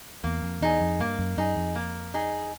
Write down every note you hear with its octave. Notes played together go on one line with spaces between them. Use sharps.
E2 A#3
F2
E2 D#4 G#4
F2
G2 A#3
F#2
F#2 D#4 G#4
F2
A#3
D#4 G#4